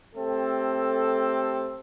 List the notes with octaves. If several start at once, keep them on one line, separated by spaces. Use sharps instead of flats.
A3 C4 G4 A4